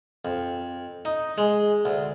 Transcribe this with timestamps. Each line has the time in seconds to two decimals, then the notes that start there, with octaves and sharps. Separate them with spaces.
0.25 F2
1.05 D#4
1.38 G#3
1.85 D2